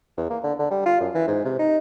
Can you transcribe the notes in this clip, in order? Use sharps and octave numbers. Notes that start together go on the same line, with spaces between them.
E2
A#3
D3
D3
G3
F4
F#2
E3
G#2
C3
D#4